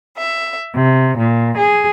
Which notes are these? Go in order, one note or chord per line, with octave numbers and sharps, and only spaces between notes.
E5
C3
A#2
G#4